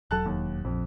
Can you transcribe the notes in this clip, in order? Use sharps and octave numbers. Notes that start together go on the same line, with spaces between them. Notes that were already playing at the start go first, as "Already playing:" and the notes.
E1 F#3 A4 A5 F#6
D#2
A#1 F2